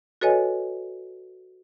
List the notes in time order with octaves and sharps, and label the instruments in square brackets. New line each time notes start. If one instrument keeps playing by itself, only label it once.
[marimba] F#4 A4 B4 C#5 D#5 G#5